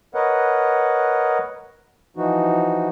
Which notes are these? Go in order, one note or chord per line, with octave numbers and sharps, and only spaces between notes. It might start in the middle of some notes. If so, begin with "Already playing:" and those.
A#4 B4 C#5 D#5 F#5
E3 F3 D#4 F#4